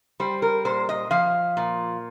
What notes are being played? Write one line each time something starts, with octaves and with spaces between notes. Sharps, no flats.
G3 C5
A#4
A#2 C5
D#5
F3 F5
A#2